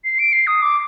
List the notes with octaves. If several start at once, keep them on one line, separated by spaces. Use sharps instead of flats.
C7
D7
C7
D#6
D6